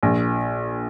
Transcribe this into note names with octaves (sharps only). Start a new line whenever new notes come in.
A#1